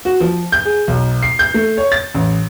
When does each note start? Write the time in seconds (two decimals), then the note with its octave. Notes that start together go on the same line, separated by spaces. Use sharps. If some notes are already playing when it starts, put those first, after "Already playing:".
0.05 F#4
0.20 F3
0.52 G6
0.65 G#4
0.88 B1
1.23 C7
1.39 G6
1.54 A3
1.78 C#5
1.92 A6
2.14 A1